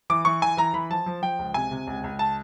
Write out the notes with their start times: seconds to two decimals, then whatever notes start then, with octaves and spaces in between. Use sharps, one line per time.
0.10 E3 D6
0.25 E3 C#6
0.42 E3 G#5
0.57 E3 A#5
0.74 E3 B5
0.90 F3 A5
1.06 F3
1.22 F3 G5
1.39 C#2
1.54 C3 G#5
1.71 C3
1.87 C#2
2.04 C#2
2.19 A5